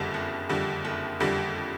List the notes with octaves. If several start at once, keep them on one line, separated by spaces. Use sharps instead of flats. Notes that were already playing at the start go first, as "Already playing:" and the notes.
Already playing: F#1 F2 D3 G3
F#1
F2 D3 G3
F#1
F2 D3 G3